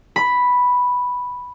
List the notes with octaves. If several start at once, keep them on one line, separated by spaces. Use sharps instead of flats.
B5